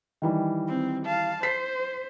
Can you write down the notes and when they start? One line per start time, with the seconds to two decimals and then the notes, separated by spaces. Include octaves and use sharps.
0.22 D#3 E3 G3
0.67 C4
1.06 F5 A5
1.43 C5 B6 C7